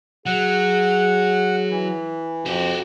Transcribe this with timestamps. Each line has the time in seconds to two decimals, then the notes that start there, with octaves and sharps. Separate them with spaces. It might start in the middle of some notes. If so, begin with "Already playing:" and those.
0.26 F#3 G#4 F#5
1.70 E3
2.46 F2 F#4 G4